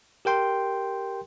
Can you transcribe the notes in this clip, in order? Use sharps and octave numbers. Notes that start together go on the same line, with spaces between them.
G4 A#4 G5 C6